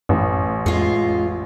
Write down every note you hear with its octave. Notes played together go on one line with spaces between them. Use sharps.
A1 F#2
F2 G#3 F4